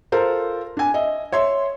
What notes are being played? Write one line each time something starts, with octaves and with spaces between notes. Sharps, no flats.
F4 A4 A#4 C5
D4 G#5
D#5 E5
C#5 E5 C6